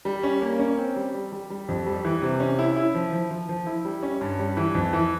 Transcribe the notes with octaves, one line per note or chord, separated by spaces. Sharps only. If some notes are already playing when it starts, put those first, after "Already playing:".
G3
C#4
A#3
C#4
C4
G3
G3
G3
G3
F2
G3
E3
C3
C#4
E4
E4
F3
F3
F3
F3
E4
G3
C#4
G2
G3
E3
F2
E3